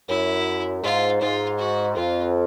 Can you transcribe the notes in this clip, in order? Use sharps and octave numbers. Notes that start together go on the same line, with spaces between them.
F#2 E4
G#2 F4
G#2 F4
F#4
F2 F4